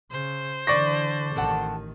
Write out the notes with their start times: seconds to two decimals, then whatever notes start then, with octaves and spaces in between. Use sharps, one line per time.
0.11 C#3 C5
0.67 D3 E3 D5 C#6 A#6
1.36 A1 C3 D#3 A4 F#5